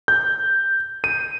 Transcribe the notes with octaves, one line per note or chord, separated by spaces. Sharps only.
G6
D#7